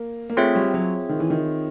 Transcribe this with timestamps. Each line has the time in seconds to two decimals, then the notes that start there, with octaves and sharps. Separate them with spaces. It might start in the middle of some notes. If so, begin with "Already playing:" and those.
Already playing: A#3
0.30 A#3
0.37 A3 C4 F4 G#4 C#5 E5
0.55 G3
0.74 F#3
1.09 D#3
1.20 E3
1.30 D#3